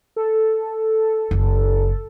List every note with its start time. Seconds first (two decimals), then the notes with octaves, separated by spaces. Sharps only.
0.16 A4
1.31 F#1 C#3